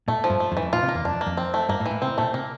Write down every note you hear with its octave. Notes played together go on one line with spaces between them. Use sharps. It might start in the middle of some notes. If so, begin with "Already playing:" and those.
A#2 A3
F3
G2
A3
F2
G2 E3
F2
A#2 F4
C3
A#3
E2
F2 D4
A#3
F2
C4
A3
G2 A#3
A2
E3
A2
C3 C4
A#2 A3
C3 A#3